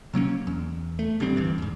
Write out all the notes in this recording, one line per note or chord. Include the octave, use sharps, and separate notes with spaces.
C3 F#3 A#3 C#4
E2
A3
A1 D3 G3 C4
D2 G2 E3
E2 G#2